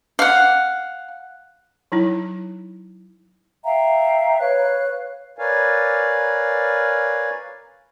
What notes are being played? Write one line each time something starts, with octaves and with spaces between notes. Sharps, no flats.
F5 F#5
F#3 D#4 E4
E5 F5 G5 A#5
B4 C#5 F5 F#6
A#4 B4 C#5 D5 F5 G#5